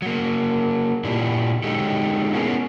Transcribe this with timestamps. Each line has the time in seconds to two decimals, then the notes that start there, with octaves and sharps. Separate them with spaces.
0.02 F#3 A#3
1.04 A#2 D4 E4 G4
1.64 D3 F#3 G#3 D#4 G4 A4
2.33 B3 C#4 E4 G#4 A#4